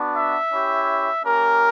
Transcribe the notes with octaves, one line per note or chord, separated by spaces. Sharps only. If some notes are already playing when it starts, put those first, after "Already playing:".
Already playing: B3 D4 F#4
E5
C#4 E4 G4
A#3 C#4 G4 A#4